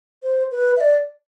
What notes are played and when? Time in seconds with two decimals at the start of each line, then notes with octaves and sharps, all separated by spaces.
0.23 C5
0.51 B4
0.77 E5
0.81 D5